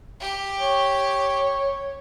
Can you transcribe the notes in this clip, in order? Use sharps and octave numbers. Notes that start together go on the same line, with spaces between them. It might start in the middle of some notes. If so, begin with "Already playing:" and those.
G4
C#5